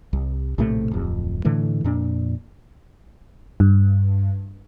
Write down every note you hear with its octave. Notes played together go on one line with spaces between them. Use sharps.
C2
A#1 A2 C3 A3
D1 F2
A2 D3 E3 A3
F2 A#2 D4
G2